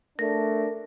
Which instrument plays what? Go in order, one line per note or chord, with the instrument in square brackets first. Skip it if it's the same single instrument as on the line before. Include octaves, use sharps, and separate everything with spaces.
[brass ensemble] A3 D4 [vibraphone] A#4